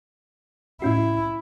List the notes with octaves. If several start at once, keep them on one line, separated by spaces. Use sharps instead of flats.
A2 C#4 E4 F#4